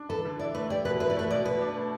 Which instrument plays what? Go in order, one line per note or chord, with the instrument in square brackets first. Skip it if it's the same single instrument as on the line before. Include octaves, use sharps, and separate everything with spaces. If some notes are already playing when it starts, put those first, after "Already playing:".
Already playing: [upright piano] D4
[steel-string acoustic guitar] A4 [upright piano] B4
[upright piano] D3
[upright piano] E4 [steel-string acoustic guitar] D5
[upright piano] A3 [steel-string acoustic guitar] B4
[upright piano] G4 [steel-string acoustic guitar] D5
[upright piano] B2 [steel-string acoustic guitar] B4
[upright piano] E4 [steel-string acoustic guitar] B4
[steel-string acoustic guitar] D5
[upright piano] A3 [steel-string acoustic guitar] B4
[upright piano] B2 [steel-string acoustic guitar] D5
[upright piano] B2 [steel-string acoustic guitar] B4
[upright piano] D4
A3